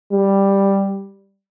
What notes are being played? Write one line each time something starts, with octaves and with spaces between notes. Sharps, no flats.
G3